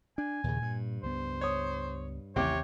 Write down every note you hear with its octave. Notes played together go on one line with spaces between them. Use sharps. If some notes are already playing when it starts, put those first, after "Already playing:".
D4 G#5
D#2 A#2 C#3
G2
C#2 B3 C5
C#5 D#6
D1 A1 D#2 C3 C4 C#5 G5 D6